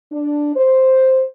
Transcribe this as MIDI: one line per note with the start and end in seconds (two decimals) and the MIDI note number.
0.12 0.52 62
0.56 1.24 72